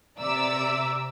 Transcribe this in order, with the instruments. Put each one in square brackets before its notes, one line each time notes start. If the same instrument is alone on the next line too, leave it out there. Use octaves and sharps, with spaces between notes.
[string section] C3 D5 E5 A#5 D6 E6